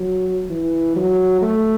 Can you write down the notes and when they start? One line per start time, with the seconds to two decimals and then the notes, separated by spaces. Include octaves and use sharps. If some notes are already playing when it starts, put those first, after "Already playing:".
Already playing: F#3
0.50 E3
0.96 F#3
1.42 A3